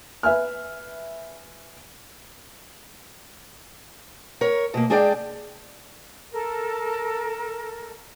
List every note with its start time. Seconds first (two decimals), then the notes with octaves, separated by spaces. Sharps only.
0.23 B4 E5 G#5 F6
4.41 A#4 C#5
4.74 B2 A#3
4.90 G#3 D4 G#4 D5 E5 G5
6.32 A4 A#4